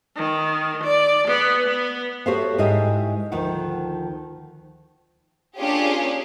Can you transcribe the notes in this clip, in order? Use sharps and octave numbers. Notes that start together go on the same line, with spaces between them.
D#3
D5
B3
B3
F#4 G4 A4 C5 C#5 F5
G#2 G#3 E4 G4 D#5
D2 D#3 F3 F#5
A#3 C#4 D4 F4 G4 G#4